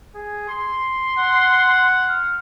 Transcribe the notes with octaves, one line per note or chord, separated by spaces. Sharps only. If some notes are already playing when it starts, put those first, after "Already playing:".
G#4
C6
F#5
F6